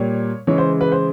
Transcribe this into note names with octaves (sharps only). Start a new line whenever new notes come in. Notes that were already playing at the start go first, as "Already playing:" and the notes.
Already playing: A#2 G3 C#5
C#3 E3 G#3 C#5
C5
B4
C5